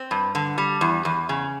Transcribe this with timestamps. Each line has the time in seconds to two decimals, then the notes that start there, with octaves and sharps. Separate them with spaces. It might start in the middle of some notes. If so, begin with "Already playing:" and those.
Already playing: C4
0.11 G2
0.35 D3
0.58 G3
0.81 E2
1.05 E2
1.29 C#3